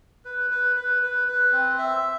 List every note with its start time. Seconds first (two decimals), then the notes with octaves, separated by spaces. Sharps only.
0.25 B4
0.50 B4
0.76 B4
1.02 B4
1.28 B4
1.52 C4
1.78 E5